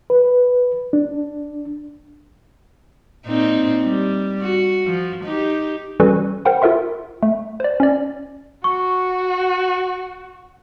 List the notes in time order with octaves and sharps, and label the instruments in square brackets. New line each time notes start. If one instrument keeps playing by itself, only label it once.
[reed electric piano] B4
D4
[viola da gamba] A#2 C4 D#4
G3
F#4
F3
D#4 G4
[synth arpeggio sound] E3 G3 C#4 F#4 A4 B4
A#4 C5 F#5 G5 B5
F4 A4 A#4 E5 C6
A3
C5 D5
C#4 D5
[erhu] F#4 [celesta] C#6